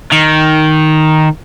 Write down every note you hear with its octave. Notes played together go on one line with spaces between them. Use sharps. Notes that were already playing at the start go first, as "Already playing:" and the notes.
D#3